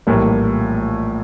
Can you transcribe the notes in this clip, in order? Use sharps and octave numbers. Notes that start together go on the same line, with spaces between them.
A#1 A2 E3 G3 A#3